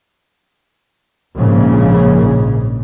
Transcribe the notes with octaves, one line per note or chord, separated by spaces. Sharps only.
A#1 G#2 C#3